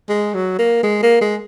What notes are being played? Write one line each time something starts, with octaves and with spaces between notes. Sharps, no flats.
G#3
F#3
A#3
G#3
A#3
G#3